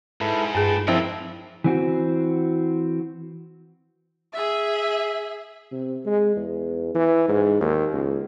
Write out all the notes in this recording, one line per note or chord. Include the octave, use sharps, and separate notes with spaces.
G#2 E4 A4 B4
G2 G#4 B4 G5 A5
F3 C4 D4 E4 F4 A#4 D#5
E3 C4 F#4
G#4 E5
C3
G#3
E2
E3
G#2
D#2
C#2